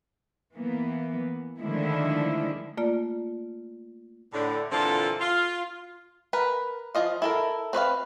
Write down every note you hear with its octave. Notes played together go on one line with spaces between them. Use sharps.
E3 A#3 B3
D3 D#3 F3 G#3 A3 E4
A3 A#3 F4 D5
A2 D3
A#2 D3 E3 C4 F4 A4
F4
A#4 B4
F3 F4 D#5 F5
E4 A4 A#4
C4 B4 C#5 F5